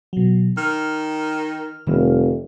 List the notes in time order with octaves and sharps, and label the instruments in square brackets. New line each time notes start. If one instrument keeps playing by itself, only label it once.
[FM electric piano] B2 F#3
[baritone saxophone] D#3 [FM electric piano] F6
[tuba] F1 [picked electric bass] D#3 G3 C4